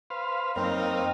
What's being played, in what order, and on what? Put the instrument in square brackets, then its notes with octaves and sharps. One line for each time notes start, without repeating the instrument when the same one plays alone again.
[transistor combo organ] B4 C5 F5
[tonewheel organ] F#2 A#3 C#5 [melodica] C4 [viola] D#4 [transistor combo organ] A#4 F5